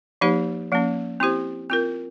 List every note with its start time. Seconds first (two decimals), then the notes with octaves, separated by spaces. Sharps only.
0.21 F3 A#3 D#4 G4 C5
0.72 F3 A#3 C#4
1.20 C4 E4 G4 C5
1.70 C4 F4 A#4